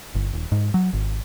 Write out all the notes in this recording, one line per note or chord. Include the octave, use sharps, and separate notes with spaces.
G1
D#1
G#2
F#3
G#1